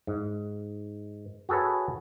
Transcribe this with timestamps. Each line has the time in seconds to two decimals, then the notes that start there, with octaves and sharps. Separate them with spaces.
0.07 G#2
1.49 F#4 G#4 A4 B4 C#5